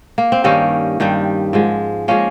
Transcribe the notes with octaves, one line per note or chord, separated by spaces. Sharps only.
A#3
C4
G2 D#3 G3 A#3 C#4
G2 D#3 G3
G#2 F3 G#3
F3 G#3 A#3 C#4